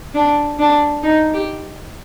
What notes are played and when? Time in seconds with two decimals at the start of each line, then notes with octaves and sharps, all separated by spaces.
0.15 D4
0.59 D4
1.03 D#4
1.34 G4